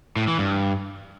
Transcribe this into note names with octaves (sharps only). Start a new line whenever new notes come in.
A2
E3
G2